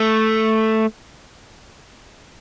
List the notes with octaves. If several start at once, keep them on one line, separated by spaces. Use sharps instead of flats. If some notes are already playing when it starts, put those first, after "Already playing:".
Already playing: A3